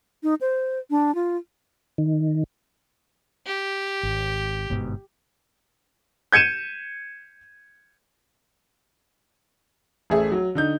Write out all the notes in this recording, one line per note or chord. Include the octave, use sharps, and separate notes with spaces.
D#4
C5
D4
F4
D#3
G4
G#1
G1 G#2 B2
G6 G#6 C#7 D#7 E7
A1 A3 G#4 E5
F#3
D3 D#4 G6